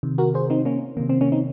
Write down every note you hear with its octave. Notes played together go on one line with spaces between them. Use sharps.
C3 D#3
F#4 A#4
G#4 C5
C4 D#4
A#3 C#4
C3 D#3 A#3
C4
A#3 C#4
C4 D#4